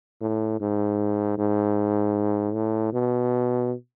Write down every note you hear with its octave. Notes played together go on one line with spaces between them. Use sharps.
A2
G#2
G#2
A2
B2